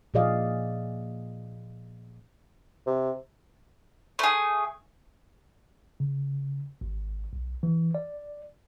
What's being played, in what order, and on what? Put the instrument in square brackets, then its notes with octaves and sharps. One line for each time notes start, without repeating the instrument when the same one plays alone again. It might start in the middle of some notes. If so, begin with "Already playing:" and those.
[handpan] A#2 F3 G#4 D5 D#5 F5
[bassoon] C3
[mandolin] A3 G#4
[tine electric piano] C#3
G#1
B1
E3
D5